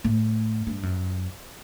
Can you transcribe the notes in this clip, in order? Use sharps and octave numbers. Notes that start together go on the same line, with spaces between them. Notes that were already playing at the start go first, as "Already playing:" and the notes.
A2
G2
F#2